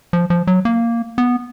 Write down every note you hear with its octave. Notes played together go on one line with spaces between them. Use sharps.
F3
F3
F#3
A#3
B3